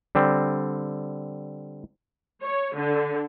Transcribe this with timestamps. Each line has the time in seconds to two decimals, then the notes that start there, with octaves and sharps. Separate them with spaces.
0.15 D3 G3 C4
2.43 C#5
2.75 D3